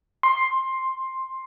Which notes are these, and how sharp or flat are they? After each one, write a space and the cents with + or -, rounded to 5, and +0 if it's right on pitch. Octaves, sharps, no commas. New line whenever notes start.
C6 +10